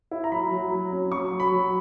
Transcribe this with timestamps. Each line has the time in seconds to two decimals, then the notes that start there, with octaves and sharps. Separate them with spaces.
0.11 E4
0.24 A#5
0.32 F#3 B5
0.52 F#3
0.71 F#3
0.92 C#4
1.12 F#3 C#6
1.33 F#3
1.40 B5
1.52 F#3